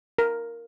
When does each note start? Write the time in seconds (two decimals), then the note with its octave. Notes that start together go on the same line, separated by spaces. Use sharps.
0.18 A#4